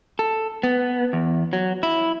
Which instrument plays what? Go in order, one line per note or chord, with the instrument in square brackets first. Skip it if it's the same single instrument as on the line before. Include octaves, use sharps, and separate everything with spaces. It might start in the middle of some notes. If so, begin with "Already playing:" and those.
[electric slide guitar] A4
B3
E2
F#3
E4